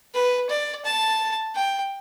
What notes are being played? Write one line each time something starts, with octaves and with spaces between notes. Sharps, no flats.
B4
D5
A5
G5